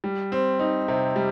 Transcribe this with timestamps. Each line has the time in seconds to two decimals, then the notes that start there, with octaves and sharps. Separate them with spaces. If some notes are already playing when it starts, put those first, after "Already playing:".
0.04 G3
0.32 C4
0.59 D#4
0.88 C3
1.16 G3